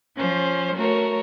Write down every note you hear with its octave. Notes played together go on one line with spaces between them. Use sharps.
F3 C#4 C5
A3 F#4 A#4 C#5